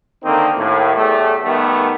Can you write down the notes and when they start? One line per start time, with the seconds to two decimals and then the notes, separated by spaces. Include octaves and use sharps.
0.24 D3 D#3 A#3 C4 D#4
0.57 D#2 A2
0.96 E2 A2 G3 A3
1.44 D#3 G3 A3 B3